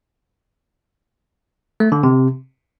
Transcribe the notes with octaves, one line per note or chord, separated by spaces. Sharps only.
A3
D3
C3